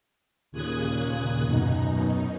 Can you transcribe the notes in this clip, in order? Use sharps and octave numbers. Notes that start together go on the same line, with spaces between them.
D#2 A#2 C#3 D#6 F#6 G#6
F#2 B2 D#4